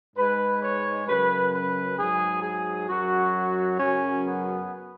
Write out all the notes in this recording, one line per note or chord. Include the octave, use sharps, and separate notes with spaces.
G#2 G#3 B4
C#5
F#2 C#3 F#3 B4
B4
G#2 F#3 G#4
G#4
F#2 F#3 F#4
F#2 C#3 F#3 C#4
B3